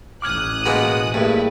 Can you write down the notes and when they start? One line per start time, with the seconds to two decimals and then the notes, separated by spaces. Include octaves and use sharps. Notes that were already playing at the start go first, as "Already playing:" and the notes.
0.22 A1 D6 D#6 F6 F#6 G#6
0.66 B2 G#3 A#3 B4 D#5
1.14 G2 A3 A#3 E4 G#4 B4